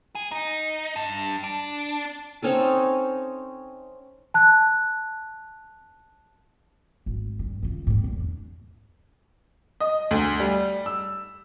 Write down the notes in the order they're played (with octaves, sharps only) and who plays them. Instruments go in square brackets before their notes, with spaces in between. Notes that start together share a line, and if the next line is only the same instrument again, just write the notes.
[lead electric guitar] G#4
D#4
G2
D4
[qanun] C4 C#4 D#4 A4
[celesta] A5 F#6
[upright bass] G#1
G2
C#2 C#3
G#2 C4
E2
D4
[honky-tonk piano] D#5
D2
G3
E6